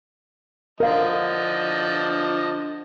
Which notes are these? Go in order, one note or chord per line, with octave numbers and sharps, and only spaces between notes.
D3 F3 A#4 D#5 F5